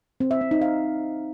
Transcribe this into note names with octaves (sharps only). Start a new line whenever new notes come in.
C4
E5
C4
D#4
F5